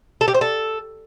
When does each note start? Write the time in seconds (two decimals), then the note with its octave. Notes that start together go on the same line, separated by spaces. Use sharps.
0.21 A4
0.28 G4
0.34 C5
0.41 A4